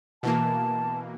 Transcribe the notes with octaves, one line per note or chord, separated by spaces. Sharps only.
B2 E3 A#3 A5